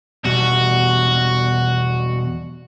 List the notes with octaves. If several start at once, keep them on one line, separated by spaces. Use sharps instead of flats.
E2 B2 G3 F#4